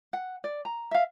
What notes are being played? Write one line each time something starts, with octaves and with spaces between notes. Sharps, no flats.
F#5
D5
A#5
E5 F5